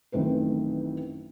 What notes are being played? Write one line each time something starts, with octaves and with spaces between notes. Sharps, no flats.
A1 F#2 D#3 A3 C4 B4